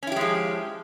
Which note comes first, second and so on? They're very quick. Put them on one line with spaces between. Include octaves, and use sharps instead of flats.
C#4 E4 G4 G#3 F3